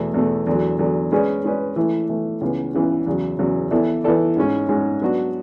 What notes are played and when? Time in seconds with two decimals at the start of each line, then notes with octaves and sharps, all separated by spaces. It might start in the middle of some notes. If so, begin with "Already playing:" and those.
Already playing: E2 B2 A3
0.14 E2 B2 A3
0.47 E2 D3 F#3
0.79 E2 D3 F#3
1.12 G#3 C#4 G#4 B4 D5
1.44 G#3 C#4 G#4 B4 D5
1.76 E3 A3 E4
2.09 E3 A3 E4
2.41 C#2 C#3 E3 B3
2.75 C#2 C#3 E3 B3
3.07 E2 C#3 F#3
3.39 E2 C#3 F#3
3.71 E3 B3 E4 A4 D5
4.04 E3 B3 E4 A4 D5
4.36 G#2 G#3 C#4
4.69 G#2 G#3 C#4
5.02 F#3 B3 D4 F#4